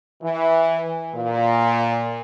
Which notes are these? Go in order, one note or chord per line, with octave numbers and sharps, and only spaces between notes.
E3
A#2